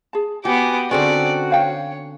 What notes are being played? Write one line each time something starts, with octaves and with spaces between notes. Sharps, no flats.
G#4 A5
B3 F#4 G4 G#5 D6
D3 C4 C#4 F#4 G#4 D5
C5 C#5 F5 G5